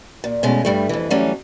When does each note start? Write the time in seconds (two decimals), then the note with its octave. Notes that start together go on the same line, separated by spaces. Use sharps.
0.24 A#2
0.43 B2 G#3 A3 C#4
0.65 G2 G3 A3
0.89 F2 E3
1.10 E3 F#3 G3 A3 C#4